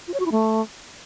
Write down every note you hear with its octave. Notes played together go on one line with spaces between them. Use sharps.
F4
C#5
F#4
E4
A3